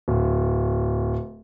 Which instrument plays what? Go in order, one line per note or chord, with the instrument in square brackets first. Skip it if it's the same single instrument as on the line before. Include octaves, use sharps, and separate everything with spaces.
[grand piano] D1